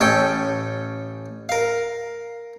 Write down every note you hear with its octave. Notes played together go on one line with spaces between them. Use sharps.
A1 C#4 A4 G5
A#4 F5